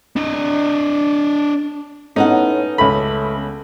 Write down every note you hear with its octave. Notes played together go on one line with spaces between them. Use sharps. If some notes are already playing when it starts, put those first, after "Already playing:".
D4 D#5
A2 B3 C#4 D#4 F#5
C#2 A3 B5